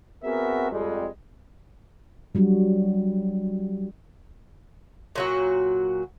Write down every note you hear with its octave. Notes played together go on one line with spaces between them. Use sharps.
B3 C4 F#4 G#4 A#4 E5
F2 G3 G#3
F#3 G3 D4 F#4
A#2 F#3 F#4